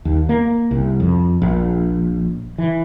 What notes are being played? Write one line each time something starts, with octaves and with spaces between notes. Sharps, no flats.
D#2
A#3
C2
F2
A#1
E3